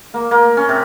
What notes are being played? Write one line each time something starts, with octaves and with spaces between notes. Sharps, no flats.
A#3
A#3
C#4
C3